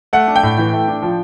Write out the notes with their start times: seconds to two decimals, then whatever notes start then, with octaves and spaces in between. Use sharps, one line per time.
0.13 A3 F#5
0.28 D4
0.36 G5
0.43 A2
0.58 E3
0.73 A3
0.88 D4
1.02 F3